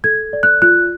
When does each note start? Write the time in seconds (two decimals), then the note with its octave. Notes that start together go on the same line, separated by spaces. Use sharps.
0.04 A4 G#6
0.33 D5
0.43 F#6
0.62 F4 F#6